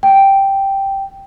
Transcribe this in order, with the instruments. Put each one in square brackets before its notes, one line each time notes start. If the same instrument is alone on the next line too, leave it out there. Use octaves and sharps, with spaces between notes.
[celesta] G5